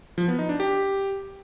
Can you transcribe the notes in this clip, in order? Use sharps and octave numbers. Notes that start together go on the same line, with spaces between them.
F3
B3
D#4
D4
G4